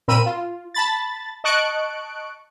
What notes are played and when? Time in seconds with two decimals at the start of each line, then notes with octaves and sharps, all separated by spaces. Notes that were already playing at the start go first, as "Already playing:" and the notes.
0.08 A#2 C4 A#4 B5 E6 D#7
0.26 F4
0.74 A5 B5 A6
1.44 D#5 A5 C#6 F#6 C#7 D7